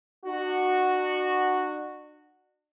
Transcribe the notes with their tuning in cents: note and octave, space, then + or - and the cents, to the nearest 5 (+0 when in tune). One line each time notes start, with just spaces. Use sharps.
D4 +40 F#4 -5